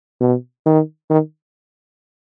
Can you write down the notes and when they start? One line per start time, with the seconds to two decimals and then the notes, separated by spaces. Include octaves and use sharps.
0.21 B2
0.66 D#3
1.10 D#3